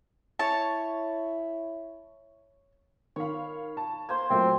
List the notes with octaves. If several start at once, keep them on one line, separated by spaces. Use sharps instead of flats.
E4 C#5 A5
D#3 C#5 F5 B5
A5
A#3 C5 C6 G#6
A#2 F#3 A3 C4